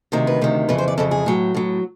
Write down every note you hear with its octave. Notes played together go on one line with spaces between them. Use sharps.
D2 C3 D#3 A#4
B4
D2 C3 D#3
F2 C#3 E3 B4
C5
D5
F2 C#3 E3 A4
G#4
A2 F#3
A2 F#3